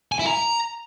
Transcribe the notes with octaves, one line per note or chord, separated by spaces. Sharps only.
G#5
E4
A#5